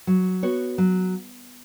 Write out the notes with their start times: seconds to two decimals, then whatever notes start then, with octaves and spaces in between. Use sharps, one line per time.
0.07 F#3
0.43 B3 F#4 C#5
0.78 F#3